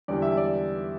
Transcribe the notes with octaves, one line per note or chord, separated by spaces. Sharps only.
E2 D3 G3 D5
E5
D5